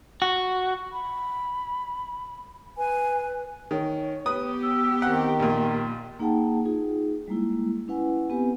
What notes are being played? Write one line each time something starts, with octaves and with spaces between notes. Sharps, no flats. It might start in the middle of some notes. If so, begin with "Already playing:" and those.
F#4
B5
B4 G#5
D#3 C#5
B3 G4 B4 D#6
E6
D#3 C4 F#5 G5
A#1 A#2 C6
A#3 D#4 G#4 F#5 G5 A5
D#4 F4 G#4
G3 G#3 A#3 E4
C#4 E4 B4 F#5 G#5
B3 C4 G4 B4 G#5